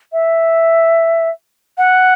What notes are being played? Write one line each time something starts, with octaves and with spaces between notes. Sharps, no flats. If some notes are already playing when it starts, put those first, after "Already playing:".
E5
F#5